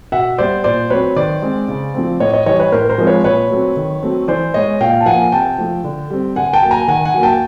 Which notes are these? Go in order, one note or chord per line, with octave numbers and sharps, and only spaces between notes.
B2 E5 F#5
G3 B3 C5 D5
A#2 C5 D5
F#3 A3 C4 B4 C#5
D#3 C5 D5
G#3 C4
C#3
F3 A3 C4
A2 C#5 D#5
C#5 D#5
E3 G3 C#5 D#5
B4 C#5
A2 A#4 C5
A#4 C5
F3 G#3 C4
B4 C#5
A#2 B4 C#5
F#3 A3 C4
D#3
F#3 A3 C4
E3 C5 D5
G#3 B3 C#5 D#5
A#2 F5 G5
A5
F3 A#3 F#5 G#5
C3 G5 A5
F3 A3
D3
G3 C4
D3 F#5 G#5
G5 A5
F#3 A#3
G#5 A#5
D#3 F#5 G#5
F#5 G#5
F#3 A#3
G5 A5